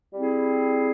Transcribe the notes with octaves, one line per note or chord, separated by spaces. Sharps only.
G3 C4 E4 G#4